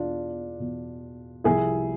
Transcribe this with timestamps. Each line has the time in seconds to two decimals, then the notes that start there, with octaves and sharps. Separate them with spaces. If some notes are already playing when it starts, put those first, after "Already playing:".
Already playing: E2 B2 D4 F4
0.59 E2 B2
1.44 C2 C3 F3 E4 G#4